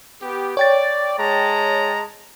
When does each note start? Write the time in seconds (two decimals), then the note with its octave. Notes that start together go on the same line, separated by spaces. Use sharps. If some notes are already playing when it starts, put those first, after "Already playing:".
0.22 B3 G4
0.57 C#5 D5 G5 A6
1.18 G#3 A5 A#5